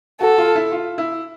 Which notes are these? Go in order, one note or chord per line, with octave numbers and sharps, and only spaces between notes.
F#4 A4
F4
E4
F4
E4